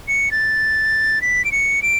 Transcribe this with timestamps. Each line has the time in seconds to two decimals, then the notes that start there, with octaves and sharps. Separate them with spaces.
0.08 C#7
0.32 A6
1.22 B6
1.45 D7
1.52 C#7
1.83 D7